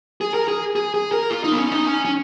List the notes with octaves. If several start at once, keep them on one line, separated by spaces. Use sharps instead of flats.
G#4
A#4
G#4
G#4
G#4
A#4
F4
D#4
B3
C#4
D#4
C#4
C#4